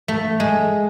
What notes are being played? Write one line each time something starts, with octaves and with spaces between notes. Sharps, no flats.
A3
G#3